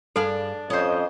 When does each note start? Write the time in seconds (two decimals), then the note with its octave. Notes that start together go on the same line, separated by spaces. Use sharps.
0.16 G2 D4 G#4 A4 F5
0.70 F2 C#4 C5 D#5